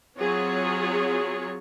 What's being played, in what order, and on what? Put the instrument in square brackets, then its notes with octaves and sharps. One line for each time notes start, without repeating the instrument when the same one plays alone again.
[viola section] F#3 C4 F4 G#4 C#5